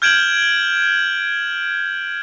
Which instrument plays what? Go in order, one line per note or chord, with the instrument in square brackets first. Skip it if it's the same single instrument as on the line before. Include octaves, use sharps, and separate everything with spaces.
[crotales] F6 G6 G#6 D7 E7 F#7